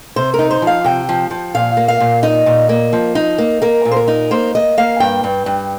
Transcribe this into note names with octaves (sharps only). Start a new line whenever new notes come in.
C3 C5
A#4
D#4
C5
F3
F5
C3 G5
F3
F3
A#2 F5
A#3
F5
A#2
D#4 D#5
A#2
A#3
F3
D#4
A#3
A#3 A#4
A#2
C5
A#4
D#4
A#3 C5
A#3 D#5
A#3 F5
G2 G5
G2
G2